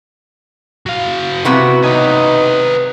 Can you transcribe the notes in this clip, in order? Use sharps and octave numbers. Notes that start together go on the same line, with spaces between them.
F#3 F5
C3 B3 E4 F#4
C#4 D#4 B4